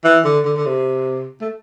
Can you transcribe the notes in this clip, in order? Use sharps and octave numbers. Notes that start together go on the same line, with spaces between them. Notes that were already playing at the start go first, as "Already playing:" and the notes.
E3
D3
D3
D3
C3
A3